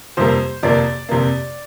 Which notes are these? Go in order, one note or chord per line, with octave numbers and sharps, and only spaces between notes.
F2 C3 G3 A#3 C5
F2 C3 F3 A#3 D5
F2 C3 F3 A#3